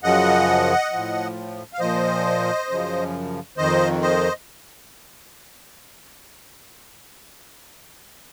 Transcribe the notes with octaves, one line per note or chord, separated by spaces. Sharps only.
F#2 C#3 F3 D#5 F#5
A2 F3
F5
A#2 F3 C5 D#5
F#2 C#3 F3
F2 D#3 C5 D#5
C5 D#5